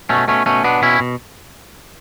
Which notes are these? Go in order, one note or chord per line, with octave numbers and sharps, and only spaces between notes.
B2 A3 C#4
B2 A3 C#4
B2 A3 C#4
B2 B3 D4
B2 C#4 E4
B2